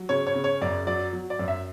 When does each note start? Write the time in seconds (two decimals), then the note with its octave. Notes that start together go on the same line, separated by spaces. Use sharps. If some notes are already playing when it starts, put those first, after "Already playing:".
Already playing: F#3
0.09 C#3 C#5
0.27 C#5
0.35 C#3
0.44 C#5
0.61 F#2 D5
0.86 F#3 D5
1.13 F#3
1.30 D5
1.39 F#2
1.48 E5